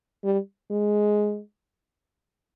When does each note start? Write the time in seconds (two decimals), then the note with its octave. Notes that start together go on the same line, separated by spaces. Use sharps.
0.24 G3
0.71 G#3